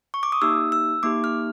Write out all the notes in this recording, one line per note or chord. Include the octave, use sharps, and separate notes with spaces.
C#6
D6
D#6
A#3 D#4 G4 E6
E6
A#3 D#4 G4 D6
F6